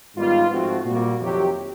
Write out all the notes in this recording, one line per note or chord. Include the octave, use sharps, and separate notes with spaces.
G#2 D#3 G3 B3 F4
G#2 F3 A3 C4 F#4
A#2 G3 A#3 F#4
F2 C3 D#3 F#3 G4